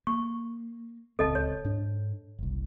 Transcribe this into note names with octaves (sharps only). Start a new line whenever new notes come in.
A#3 C#6
D1 C#2 C4 A4 D#5 A5
C#5
G#2 D4
F#1 C2